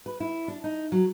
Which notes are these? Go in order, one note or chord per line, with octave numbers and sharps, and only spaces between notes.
B4
E4
D4
D#4
F#3